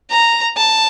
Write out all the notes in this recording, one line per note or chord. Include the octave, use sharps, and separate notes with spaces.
A#5
A5